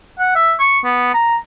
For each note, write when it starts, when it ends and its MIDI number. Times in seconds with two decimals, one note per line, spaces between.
0.19 0.34 78
0.36 0.54 76
0.60 0.79 85
0.84 1.12 59
1.13 1.36 82